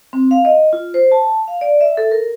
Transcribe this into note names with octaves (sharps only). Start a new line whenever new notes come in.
C4
F5
D#5
F4
C5
A5
F5
D5
E5
A4
A#4